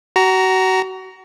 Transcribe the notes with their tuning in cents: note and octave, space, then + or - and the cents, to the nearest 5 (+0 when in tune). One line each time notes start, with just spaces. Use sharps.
F#4 +30 A#5 +0